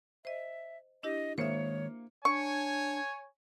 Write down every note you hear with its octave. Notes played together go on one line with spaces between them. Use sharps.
C5 D#5 E5
D4 E4 G4 D#5
D#3 G#3 A#3 C5 C#5 E5 C#7
D4 C#5 G#5 C#6